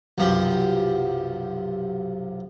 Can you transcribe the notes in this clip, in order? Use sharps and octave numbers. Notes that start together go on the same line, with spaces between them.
B1 F#2 C3 F3 G4